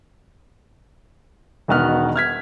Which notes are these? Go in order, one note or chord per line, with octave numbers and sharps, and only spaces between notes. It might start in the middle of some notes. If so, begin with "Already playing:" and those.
E1 B2 D#3 B3 F#4 F6
F6 G#6 B6